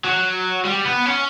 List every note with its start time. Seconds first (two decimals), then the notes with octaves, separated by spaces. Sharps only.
0.05 F#3
0.65 G3
0.86 B3
1.06 C#4